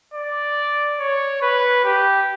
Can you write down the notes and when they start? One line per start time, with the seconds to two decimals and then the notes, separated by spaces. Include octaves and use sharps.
0.14 D5
0.99 C#5
1.42 B4
1.84 G4